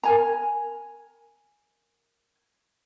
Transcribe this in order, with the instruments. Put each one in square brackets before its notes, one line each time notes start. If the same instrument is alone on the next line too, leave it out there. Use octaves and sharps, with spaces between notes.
[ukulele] A#4 G#5 A#5